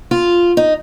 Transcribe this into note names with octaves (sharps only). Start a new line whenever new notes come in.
F4
D#4